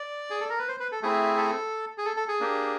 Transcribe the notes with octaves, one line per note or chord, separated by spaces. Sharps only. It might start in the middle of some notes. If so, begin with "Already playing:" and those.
Already playing: D5
G#4
A4
A#4
B4
C5
B4
A4
A3 C4 E4 G#4
A4
G#4
A4
A4
G#4
A#3 D4 G4